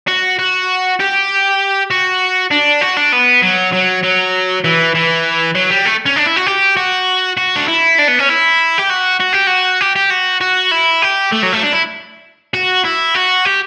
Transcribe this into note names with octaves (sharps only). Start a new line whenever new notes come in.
F#4
F#4
G4
F#4
D4
F#4
D4
B3
F#3
F#3
F#3
E3
E3
F#3
G3
A3
C#4
D4
E4
F#4
G4
F#4
F#4
D4
E4
D4
B3
C#4
E4
G4
F#4
F#4
G4
F#4
G4
G4
F#4
F#4
E4
G4
A3
F#3
A3
D4
E4
F#4
E4
F#4
G4